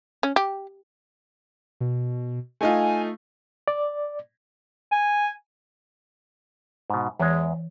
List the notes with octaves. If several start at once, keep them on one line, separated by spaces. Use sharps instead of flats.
C#4
G4
B2
A3 D#4 F4 G#5
D5
G#5
G#2 B2
E2 E3 G#3